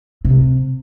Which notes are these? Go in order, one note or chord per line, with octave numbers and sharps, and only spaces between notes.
C3